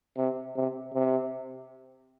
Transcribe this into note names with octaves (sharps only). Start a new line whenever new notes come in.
C3
C3
C3